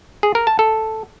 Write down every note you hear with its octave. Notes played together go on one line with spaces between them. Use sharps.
G#4
A#4
A5
A4